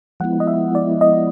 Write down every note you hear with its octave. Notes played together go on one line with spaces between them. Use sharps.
F3 G#3 B3 E4 F#5
D#5
E5
D5
D#5